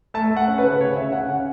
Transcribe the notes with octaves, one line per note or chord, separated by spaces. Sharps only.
A3 A5
A3
F#5
C#4
B4
C#3
C#3 C#5
C#3 E5
C#3 F#5
C#4 F#5